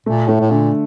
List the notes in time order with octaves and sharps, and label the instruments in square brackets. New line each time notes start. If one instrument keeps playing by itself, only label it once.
[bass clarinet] A#2 [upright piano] A3
[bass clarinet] A2 [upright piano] A3
[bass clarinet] A2
[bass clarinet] A#2 [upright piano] D3